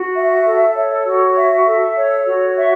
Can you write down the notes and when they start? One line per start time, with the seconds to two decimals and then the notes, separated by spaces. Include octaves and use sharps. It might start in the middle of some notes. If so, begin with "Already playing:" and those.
Already playing: F#4
0.15 E5
0.45 A4
0.76 C#5
1.06 F#4
1.36 E5
1.66 A4
1.97 C#5
2.27 F#4
2.57 E5